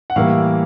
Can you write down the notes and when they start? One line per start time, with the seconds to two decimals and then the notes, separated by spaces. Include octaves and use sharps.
0.10 F#5
0.16 A2 E3 G3 A#3 F5